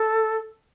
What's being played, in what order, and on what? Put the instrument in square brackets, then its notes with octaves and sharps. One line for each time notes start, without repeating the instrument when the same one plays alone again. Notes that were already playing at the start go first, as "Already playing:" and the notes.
Already playing: [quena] A4